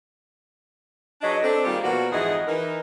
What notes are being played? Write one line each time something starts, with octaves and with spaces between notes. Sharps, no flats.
F#3 D4 G#4 B4 D#5
C4 D4 A4
D#3 G3 G#3 A#3 F4 G4
B2 F3 A#3 F#4 D5
F2 G#2 E3 G#4 D#5 F#5
E3 D#4 A#4